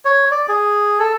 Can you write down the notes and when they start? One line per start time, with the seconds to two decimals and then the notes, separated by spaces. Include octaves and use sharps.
0.05 C#5
0.31 D5
0.48 G#4
1.00 A4